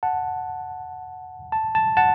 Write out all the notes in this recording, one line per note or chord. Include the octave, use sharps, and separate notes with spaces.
F#5 A5
A5
A5
F#5 A5